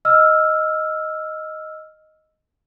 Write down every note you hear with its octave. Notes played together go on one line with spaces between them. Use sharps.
D#5 E6 F6